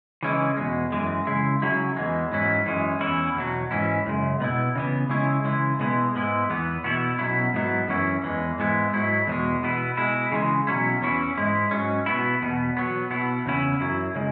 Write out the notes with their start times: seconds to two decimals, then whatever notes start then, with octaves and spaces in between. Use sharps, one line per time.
0.23 C#3 E3 G#3 C#4 E4
0.57 E2 B2 G#3
0.92 F#2 E3 G#3
1.27 C#3 G#3 E4
1.62 C#3 F#3 C#4 E4
1.97 E2 E3 G#3
2.32 G#2 F#3 C#4 E4
2.66 F#2 E3 G#3 C#4
3.01 E2 E3 C#4 E4
3.35 E2 B2 F#3
3.71 G#2 E3 C#4 E4
4.06 F#2 C#3 G#3
4.40 B2 B3 E4
4.75 C#3 E3 B3
5.09 C#3 G#3 C#4 E4
5.44 C#3 E3 G#3 E4
5.79 B2 G#3 B3 E4
6.15 G#2 G#3 B3 E4
6.49 E2 E3 B3
6.84 B2 B3 E4
7.19 B2 F#3 C#4 E4
7.54 G#2 F#3 B3 E4
7.88 F#2 E3 C#4 E4
8.24 E2 E3 G#3
8.59 G#2 G#3 B3 E4
8.93 G#2 F#3 E4
9.27 E2 B2 G#3
9.63 B2 B3 E4
9.97 B2 G#3 E4
10.32 C#3 E3 G#3
10.67 B2 F#3 C#4 E4
11.01 E2 E3 C#4 E4
11.38 G#2 G#3 E4
11.71 G#2 F#3 C#4
12.06 B2 B3 E4
12.42 E2 B2 B3
12.77 B2 F#3 B3
13.11 B2 B3 E4
13.46 E2 C#3 C#4 E4
13.80 F#2 F#3 E4
14.15 C#3 G#3